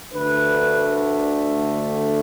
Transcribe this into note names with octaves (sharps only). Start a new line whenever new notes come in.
D2 D3 A3 B4
B4